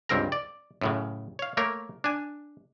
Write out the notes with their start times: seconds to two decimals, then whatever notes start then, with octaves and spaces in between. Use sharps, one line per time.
0.09 C#2 G2 C4 A#4 A#5
0.32 D5
0.81 F#2 A2 C#3
1.39 C#5 F5
1.57 A3 A#3 A#4 C#5
2.04 D4 G#5